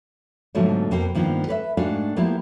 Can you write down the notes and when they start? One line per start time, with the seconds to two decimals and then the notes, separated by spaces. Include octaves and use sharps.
0.55 G#2 B2 D3 F3 F#3 A3
0.91 F2 B2 A#3 A#4 C5 G5
1.15 G2 D#3 F3 A#3 B3
1.47 A4 B4 C#5 E5
1.77 G#2 A3 D4 F#4 F5 G5
2.16 F3 A#3 B3 E4 G4